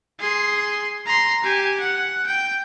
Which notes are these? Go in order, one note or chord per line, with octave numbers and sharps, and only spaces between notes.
G#4 C6
A#5 C6
G4 G#5
F#5
G5